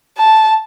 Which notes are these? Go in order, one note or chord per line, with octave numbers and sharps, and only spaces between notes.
A5